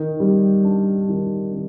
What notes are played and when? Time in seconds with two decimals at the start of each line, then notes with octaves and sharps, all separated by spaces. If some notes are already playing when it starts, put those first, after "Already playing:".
Already playing: D#3
0.20 G3
0.65 D4
1.09 D#3
1.53 D#3